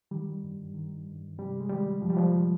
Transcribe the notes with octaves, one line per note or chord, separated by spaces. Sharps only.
D#3 G3
G2
D#3
G2
C3 G3
G#3
D#3 G3
F2 F3
G3
F3